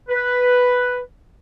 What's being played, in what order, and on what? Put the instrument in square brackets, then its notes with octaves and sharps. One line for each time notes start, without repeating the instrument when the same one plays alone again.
[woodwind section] B4